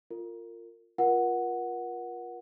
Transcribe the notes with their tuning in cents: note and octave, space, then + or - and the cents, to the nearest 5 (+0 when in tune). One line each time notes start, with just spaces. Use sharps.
F4 -5 A#4 -30
F4 +5 A#4 +35 F#5 +0